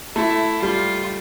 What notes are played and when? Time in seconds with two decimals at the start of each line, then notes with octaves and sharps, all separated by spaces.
0.16 A3 E4
0.61 G3 F4